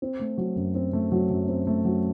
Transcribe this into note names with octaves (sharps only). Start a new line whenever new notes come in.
C4
A3
F#3
F#2
C4
A3
F#3
F#2
C4
A3
F#3